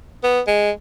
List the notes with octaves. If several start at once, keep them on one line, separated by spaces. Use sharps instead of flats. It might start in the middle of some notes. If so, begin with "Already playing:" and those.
B3
G#3